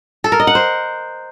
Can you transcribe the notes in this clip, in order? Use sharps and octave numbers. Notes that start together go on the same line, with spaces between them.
A4
A#4
D#5
F#5
C5